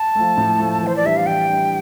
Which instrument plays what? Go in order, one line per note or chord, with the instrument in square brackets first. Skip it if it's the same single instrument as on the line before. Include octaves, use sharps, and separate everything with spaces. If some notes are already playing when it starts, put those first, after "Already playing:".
Already playing: [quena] A5
[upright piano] F3 A3
A2
F3 A3
E3
[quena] C5
D5
[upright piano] G3 D4 [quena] E5
[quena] F5
[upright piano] E3 [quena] G5
[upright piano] G3 D4